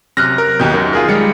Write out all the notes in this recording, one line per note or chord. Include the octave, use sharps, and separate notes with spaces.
F#2 C3 F6 F#6 A#6
A#4
D#2 B2 D#4 G4 G6
F#2 D#3
F4 G#4 A#4
G3 G#3 C#7